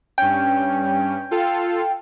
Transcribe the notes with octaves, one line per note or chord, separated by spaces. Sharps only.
G2 C#4 G5
F4 A4 F5